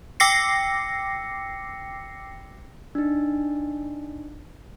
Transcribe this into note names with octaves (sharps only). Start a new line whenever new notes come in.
G5 D6 E6 A#6 C7 C#7
D4 D#4